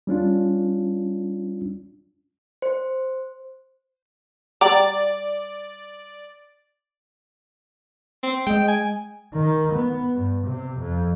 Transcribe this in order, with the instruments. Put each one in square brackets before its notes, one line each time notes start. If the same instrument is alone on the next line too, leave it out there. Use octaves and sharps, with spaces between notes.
[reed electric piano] G3 C#4 D4 F4
[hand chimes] C5
[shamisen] G3 G5 A#5 [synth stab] D5
[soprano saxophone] C4
[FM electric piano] G#3 D#5 [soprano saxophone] G5
[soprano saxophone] G#5
[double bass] D#3
B3
G2
C3
F2